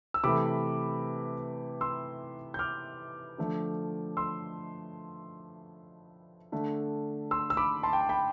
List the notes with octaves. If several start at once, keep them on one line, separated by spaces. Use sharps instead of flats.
E6
C3 E3 A3 B5 D6
C6 E6
G6
D6 F6
D3 F3 A3
C6 E6
D3 A3
C6 E6
E6
B5 D6
A5 C6
G5
A5
G5 B5